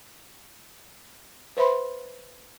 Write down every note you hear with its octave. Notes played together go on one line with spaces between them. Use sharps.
B4 C5 E5 B5 C6